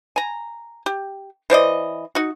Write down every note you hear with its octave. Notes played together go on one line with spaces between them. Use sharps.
G#5 A#5
G4
E3 C5 D5 D#5
D#4 F#4